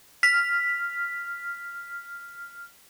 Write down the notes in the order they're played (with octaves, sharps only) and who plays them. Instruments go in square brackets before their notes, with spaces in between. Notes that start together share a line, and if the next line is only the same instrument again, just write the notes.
[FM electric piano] F6 [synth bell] B6